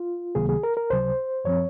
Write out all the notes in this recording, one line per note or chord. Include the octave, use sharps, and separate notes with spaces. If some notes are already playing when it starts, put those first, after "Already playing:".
Already playing: F4
C#2 C3 D#3 F#3 A#3 G#4
G#4
A#4
A#4
C#2 C3 F#3 C5
F#2 F3 C4 C#5